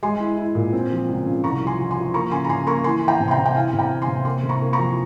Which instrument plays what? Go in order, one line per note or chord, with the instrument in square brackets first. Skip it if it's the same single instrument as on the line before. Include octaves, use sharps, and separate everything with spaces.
[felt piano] G#3 G#5 C6
E4
E4
A#2
C4
F3
C#2
C#3
C2 A#5 C#6
F3
G#5 C6
F3
G#5 C6
F3
A#3 A#5 C#6
C#3 G#5 C6
A#5
C#3 G#5 C6
A#3 A#5 C#6
E3 G#5 C6
E3
G5 A#5
C3
C6
G5 A#5
C3
G5
E4 F5 G#5
C3
G5 A#5
E3
G#5 C6
C3
A#3 G#5 C6
C3
A#5 C#6
A#3
A#5 C#6
F3